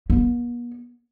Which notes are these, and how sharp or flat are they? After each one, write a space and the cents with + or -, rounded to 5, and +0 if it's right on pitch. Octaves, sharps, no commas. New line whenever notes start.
B3 -45